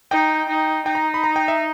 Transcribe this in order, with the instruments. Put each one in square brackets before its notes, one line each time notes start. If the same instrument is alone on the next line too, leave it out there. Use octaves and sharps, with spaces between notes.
[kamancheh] D#4 [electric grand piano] G5
[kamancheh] D#4
[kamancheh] D#4 [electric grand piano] G5
[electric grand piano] A#5
B5
A#5
G5
E5